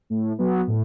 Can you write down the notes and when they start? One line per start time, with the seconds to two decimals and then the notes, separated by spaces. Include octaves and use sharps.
0.10 A2
0.38 F#3 B3
0.67 A2